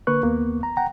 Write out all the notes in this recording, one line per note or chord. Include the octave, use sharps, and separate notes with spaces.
D3 A#3 B4 C#6 F#6
D#2 A#3 B3
A#5
F#5 G5 A#5